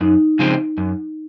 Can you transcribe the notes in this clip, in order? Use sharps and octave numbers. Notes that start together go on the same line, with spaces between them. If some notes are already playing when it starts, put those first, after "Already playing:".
F#2 D#4
C#3 F3 G#3 C4
F#2